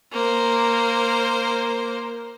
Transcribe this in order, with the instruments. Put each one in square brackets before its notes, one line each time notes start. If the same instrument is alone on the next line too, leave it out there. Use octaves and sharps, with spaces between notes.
[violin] A#3 C5